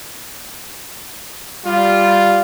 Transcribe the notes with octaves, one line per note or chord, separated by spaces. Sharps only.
G3 F4